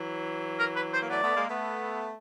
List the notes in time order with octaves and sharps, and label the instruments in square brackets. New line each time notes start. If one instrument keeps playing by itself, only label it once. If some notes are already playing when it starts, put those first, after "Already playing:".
Already playing: [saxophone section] E3 F#3
[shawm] A#4
B4
C5
[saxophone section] A#3
[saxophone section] A3 B3 [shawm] D5
[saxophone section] A3 B3
G#3 A#3
A3 B3